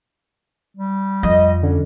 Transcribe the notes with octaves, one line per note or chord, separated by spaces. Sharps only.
G3
F2 D#5
D3 C#4